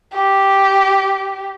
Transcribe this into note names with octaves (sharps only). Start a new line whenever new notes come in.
G4